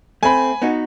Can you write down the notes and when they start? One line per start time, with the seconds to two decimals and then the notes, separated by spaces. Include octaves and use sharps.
0.23 A3 C4 G#5 B5
0.62 B3 D#4 F#4